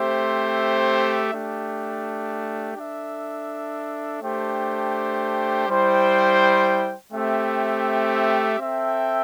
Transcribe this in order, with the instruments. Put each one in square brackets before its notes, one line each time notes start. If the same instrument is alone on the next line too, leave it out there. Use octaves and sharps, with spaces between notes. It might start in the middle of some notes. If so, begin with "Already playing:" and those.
Already playing: [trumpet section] A3 C4 G4 C5 E5
A3 D4 G4
D4 A4 E5
A3 D4 G4 C5 G5
G3 E4 C5 G5
A3 C4 G4 E5 G5
C4 A4 E5 G5